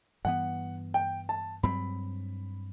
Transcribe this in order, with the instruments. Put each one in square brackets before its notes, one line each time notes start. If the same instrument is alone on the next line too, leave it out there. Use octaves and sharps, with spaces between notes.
[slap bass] G2 E3 B3 [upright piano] F#5
[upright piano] G5
A5
[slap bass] G2 F#3 C4 [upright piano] B5